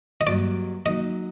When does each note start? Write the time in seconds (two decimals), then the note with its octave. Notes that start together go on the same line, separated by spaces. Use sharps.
0.21 D#5
0.26 G2 F#3 A#3 D5
0.86 F#3 A#3 D#4 D#5